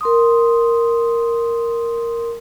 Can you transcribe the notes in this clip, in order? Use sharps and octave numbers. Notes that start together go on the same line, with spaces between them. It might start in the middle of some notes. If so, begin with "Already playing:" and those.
A#4 C6 D#6